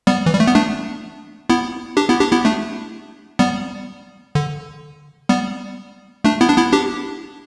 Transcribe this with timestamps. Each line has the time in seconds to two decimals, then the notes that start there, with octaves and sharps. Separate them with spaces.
0.07 G3 B3
0.26 E3
0.33 G3
0.40 A3
0.47 B3
0.55 A3 D4
1.49 B3 E4
1.97 D4 G4
2.09 B3 E4
2.20 D4 G4
2.32 B3 E4
2.45 A3 D4
3.39 G3 B3
4.35 D3
5.29 G3 B3
6.24 A3 D4
6.41 B3 E4
6.50 D4
6.57 B3 E4
6.73 D4 G4